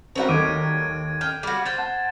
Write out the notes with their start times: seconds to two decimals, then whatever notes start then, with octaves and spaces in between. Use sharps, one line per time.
0.15 F#3 G3 C4 F#4 A#4
0.29 D#2 A4 D#5 D6 G#6 D7 D#7
1.21 G5 F6
1.43 G3 F#4
1.66 C5 G5 A6 E7
1.78 F#5 A5